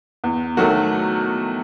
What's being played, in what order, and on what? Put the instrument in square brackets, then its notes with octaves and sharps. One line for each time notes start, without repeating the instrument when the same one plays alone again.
[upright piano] E2
D#3 F#3 A3 F#4